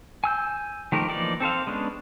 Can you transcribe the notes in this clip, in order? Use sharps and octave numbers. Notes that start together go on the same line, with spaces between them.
G#5 E6 G6
D#3 F3 A3 G4 A#4
E3 F3 A#3 D#4 D5
C4 A4 C5 F5
G#3 B3 C#4 D4